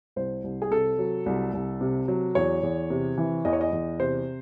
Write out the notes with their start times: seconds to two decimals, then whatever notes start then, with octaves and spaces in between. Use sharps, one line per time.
0.16 C2 C5
0.44 C2
0.62 G#4
0.71 C3 A4
0.99 F#3
1.26 C2
1.54 C2
1.81 C3
2.08 F#3
2.35 E2 C#5
2.63 E2
2.90 C3
3.18 E3
3.45 E2 D#5
3.53 C#5
3.61 D#5
3.73 E2
4.00 C3 C5